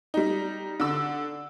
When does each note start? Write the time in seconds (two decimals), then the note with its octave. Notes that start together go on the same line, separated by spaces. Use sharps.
0.14 G3 D#4
0.80 D3 E6